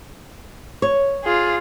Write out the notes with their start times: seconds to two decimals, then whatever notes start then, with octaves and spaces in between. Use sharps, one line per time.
0.82 C#5
1.24 F4 G#4